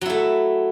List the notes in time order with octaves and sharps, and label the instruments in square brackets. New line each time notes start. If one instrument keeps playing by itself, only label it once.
[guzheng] F#3
E4
A3